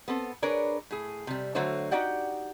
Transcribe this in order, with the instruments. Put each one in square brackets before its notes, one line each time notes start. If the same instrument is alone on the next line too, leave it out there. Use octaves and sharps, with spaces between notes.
[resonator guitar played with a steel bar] B3 C4 A4
D4 G#4 A#4 B4 C#5 D5
A2 G#4
C3 G3
D3 F#3 A3 F#4 C5 C#5
D#4 F#4 G4 D5 F#5 G5